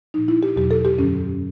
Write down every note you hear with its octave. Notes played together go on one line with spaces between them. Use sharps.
A#2 F3 D#4
E4
G4
E2 B2 F#3 G4
A4
G4
F#2 D3 F#3 C#4